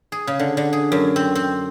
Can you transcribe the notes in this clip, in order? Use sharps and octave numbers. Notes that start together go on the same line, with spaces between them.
G#4
C#3
D3
D3
G#4
F#2
C4
C4